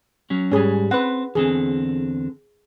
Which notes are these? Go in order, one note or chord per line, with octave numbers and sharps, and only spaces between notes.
F#3 C#4
G#2 G3 C#4 G#4
C4 B4 F#5
E2 D3 C4 G#4